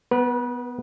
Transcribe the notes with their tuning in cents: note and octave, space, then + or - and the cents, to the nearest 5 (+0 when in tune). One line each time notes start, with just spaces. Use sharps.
B3 +5 B4 -35